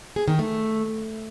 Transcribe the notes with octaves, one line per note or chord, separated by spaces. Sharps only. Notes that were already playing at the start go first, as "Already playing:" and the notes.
G#4
D#3
A3